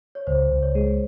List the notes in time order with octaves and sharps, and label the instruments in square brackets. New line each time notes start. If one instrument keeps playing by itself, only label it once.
[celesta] C#5
[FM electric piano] C#2 [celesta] C5
[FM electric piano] C#2
[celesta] C#5
[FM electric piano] G#3